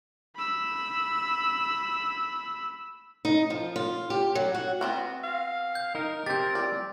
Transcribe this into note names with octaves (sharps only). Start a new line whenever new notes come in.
B5 E6
D#4
F3
F4
G4
F#3
F#4
B3 C4 F#4
F5
G6
D#4 A#4
C4 G4 G6 A6
D5